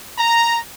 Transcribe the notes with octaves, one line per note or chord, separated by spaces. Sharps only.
A#5